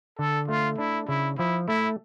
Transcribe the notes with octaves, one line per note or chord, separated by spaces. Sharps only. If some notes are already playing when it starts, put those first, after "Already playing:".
D3 A4
A3 F4
D4 E4
C#3 E4
F3 E4
A3 E4